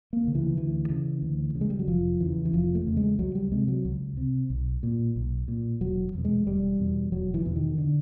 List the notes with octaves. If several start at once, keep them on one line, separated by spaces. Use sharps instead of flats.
A#3
D2 C#3
E3
D2 E3
C#3
D2
C#3
G#3
G3
F#3
F1 F3
E2 C#3 E3
E3
F1 F3
A3
E2 C#3
G#3
C#2 F#3
G3
C3 G#3
F#3
C#2
C3
B1
A#2
B1
A#2
E1 F#3
E2 B2
G#3
E1 G3
E2 B2
E1 F#3
E3
E2 B2 E3
D#3
D3